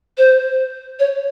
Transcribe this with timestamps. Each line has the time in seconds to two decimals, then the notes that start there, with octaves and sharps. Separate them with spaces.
0.17 C5
0.99 C#5